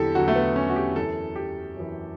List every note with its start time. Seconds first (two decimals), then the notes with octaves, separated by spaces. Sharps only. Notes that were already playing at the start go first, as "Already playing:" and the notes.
Already playing: E2 D3 F#3 E4 G4 A4
0.15 E2 D3 F#3 F#4
0.28 A3
0.36 B3
0.56 C#4
0.70 F#4
0.76 G4
0.96 F#2 E3 A4
1.36 G4
1.76 F#2 E3